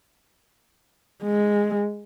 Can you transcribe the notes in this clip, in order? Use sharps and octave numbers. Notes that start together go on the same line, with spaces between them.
G#3